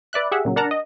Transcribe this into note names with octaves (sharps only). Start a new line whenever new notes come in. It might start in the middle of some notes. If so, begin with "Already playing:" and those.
B4 D5 E5 F#6
G4 G#4 E5 F#5
A#2 C#3 F#3
D4 A#4 F#5 A5 A#5
D#5